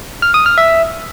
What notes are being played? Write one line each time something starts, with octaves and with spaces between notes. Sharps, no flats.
F6
D#6
F6
E5